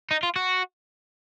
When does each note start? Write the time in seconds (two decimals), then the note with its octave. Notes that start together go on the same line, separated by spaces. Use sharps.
0.11 D#4
0.23 F4
0.36 F#4